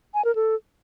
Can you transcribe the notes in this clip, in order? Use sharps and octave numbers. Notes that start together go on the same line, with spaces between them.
G#5
A#4
A4